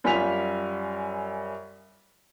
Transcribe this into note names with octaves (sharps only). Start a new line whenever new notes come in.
F#2 G3 F4 G#5 B6 F7